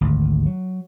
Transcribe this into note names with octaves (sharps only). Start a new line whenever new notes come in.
G#1 D2
F#3